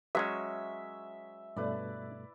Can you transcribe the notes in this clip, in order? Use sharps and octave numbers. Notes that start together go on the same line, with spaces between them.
F#3 G#3 C#4 E5
G2 B2 A3 E4 B4 D5